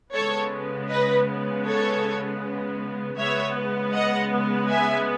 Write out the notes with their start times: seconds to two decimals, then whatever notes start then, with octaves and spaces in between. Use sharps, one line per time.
0.13 C#3 G#3 B3 A4 C#5
0.89 B4 D#5
1.65 A4 C#5
3.17 C#3 G#3 B3 C#5 E5
3.93 D#5 F#5
4.70 E5 G#5